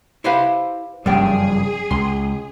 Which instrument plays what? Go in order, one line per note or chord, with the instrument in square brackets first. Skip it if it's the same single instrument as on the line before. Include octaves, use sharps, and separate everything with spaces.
[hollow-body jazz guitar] E4 C5 B5 [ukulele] G4 B4 F5
[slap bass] F#1 F3 G3 [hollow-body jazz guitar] G2 C#3 [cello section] G#4 [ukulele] D5 G5
[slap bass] C#2 [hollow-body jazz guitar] C6